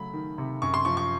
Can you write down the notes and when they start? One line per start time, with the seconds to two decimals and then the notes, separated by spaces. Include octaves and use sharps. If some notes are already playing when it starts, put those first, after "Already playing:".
Already playing: C#3 F#3 A3 B5
0.13 D#3
0.38 C3
0.62 F#2 C#6
0.74 C6
0.85 F3 C#6
0.97 C#6